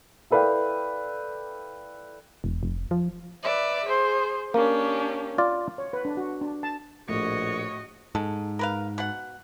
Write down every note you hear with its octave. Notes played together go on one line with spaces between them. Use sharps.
E4 A4 B4 D5 F5 G5
E1
F1
F3
B4 D5 E5
G#4 C5
A#3 C#4 D4 G4
F4 D5
C#5
B4
D4
F#4
D4
A5
A#1 A2 F#4 C#5 D#5
G#2 A4
A#4 B4 F5
B2 F#5